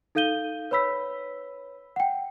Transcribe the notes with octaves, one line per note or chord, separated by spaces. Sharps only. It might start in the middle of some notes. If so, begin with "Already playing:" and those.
D#4 A4 F5 G6 D#7 G7
B4 C#5 B5 E6 B6
F#5 G5